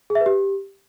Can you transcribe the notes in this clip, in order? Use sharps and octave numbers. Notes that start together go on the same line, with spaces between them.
G#4
E5
B4
G4